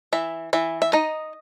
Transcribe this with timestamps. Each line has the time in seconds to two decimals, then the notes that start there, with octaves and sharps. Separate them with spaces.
0.13 E3 E5
0.53 E3 E5
0.82 E5
0.93 D#4 D#5